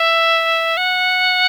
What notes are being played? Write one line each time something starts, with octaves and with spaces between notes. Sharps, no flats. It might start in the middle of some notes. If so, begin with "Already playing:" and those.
Already playing: E5
F#5